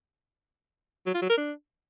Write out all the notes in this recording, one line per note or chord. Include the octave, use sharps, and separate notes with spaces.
F#3
F4
F#3
A#4
D4